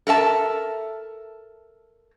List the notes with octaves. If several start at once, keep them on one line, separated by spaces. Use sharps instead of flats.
A4 A#4 E5 A5